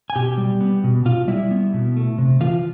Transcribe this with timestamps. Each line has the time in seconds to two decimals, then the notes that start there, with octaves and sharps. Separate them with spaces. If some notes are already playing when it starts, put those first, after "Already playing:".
0.10 G#5
0.15 B2 G4 G5
0.38 G3
0.60 B3
0.84 B2
1.05 B2 F4 F5
1.28 G3 E4 E5
1.51 B3
1.74 B2
1.96 A3
2.18 C3
2.40 E3 F4 F5